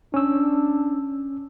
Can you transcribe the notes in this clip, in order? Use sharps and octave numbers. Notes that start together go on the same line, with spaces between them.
C#4 D4 E6